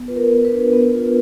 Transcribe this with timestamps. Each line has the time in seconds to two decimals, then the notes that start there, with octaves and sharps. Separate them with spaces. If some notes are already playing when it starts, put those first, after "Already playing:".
Already playing: B3
0.08 F4 B4
0.16 A#4
0.31 B3
0.45 B4
0.52 D4
0.73 B3
0.94 F4